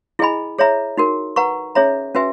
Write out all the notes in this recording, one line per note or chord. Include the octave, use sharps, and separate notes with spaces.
E4 G#4 D#5 G#5 B5
G#4 C#5 E5 A#5
D#4 F#4 A#4
B4 F#5 A#5 C#6
C#4 G#4 C#5 E5 A#5
C#4 F#4 B4 E5 G#5